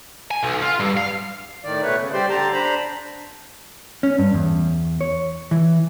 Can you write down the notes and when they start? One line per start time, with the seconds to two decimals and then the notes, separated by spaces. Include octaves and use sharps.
0.31 G#5
0.43 B1
0.62 F4
0.80 G2
0.97 F5
1.64 A2 D#3 D5
1.83 B2 A3 B4 C#5
2.00 C#3
2.13 G3 G4 C5 D5 C6
2.30 D3 G4 A5 A#5 C6
2.53 D4 C5 A#5 B5
4.03 C#4
4.18 G2
4.34 E2
5.01 C#5
5.51 E3